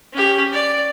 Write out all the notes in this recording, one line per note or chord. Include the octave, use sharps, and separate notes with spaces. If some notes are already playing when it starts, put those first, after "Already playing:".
C#4 G4
D5